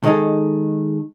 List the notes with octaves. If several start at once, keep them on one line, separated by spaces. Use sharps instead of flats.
D#3 G#3 D#4 G#4 A4